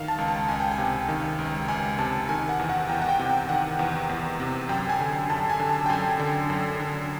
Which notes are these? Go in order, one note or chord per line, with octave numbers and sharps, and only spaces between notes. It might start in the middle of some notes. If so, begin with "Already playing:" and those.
Already playing: D#3 F5
A5
C#2
A5
C#2 G#5
G5
G#5
C3
D#3
C#2
C#2 G#5
C3 A5
D#3 G#5
F#5
E2
F#5
E2 G5
F#5
G5
C3
G5
D#3 F#5
E2
E2
C3
F#2 G5
G#5
D3
F#2 A5
G#5
D3
A5
G5
F#2 G#5
D3
F#2
D3